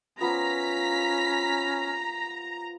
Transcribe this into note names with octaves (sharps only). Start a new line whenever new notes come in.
F3 B3 C#4 F4 A#5 B6